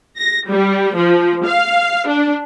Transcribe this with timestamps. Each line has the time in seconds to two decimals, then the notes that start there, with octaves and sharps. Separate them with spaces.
0.17 A#6
0.49 G3
0.96 F3
1.47 F5
2.08 D4